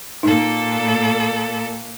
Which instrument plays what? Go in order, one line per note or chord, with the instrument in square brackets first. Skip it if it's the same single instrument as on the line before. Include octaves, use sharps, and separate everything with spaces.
[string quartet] A#2 A#3 A4 [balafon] D#4